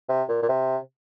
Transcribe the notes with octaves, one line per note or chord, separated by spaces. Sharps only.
C3
A#2
A#2
C3